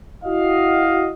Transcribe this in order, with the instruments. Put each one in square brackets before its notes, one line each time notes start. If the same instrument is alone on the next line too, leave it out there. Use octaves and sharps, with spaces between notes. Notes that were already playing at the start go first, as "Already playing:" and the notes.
[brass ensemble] E4 F#4 D#5 F5